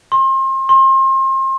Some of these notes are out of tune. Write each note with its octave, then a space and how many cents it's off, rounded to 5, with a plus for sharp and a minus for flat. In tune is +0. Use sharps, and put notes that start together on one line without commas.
C6 +35
C6 +35